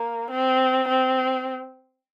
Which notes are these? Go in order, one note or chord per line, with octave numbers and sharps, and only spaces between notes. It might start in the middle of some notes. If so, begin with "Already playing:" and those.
Already playing: A#3
C4
C4